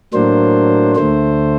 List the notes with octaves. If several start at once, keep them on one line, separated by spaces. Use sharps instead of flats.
A2 F#3 A#3 D4 C5
D2 D3 A3 C5